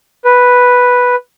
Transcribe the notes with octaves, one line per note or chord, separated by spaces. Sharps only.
B4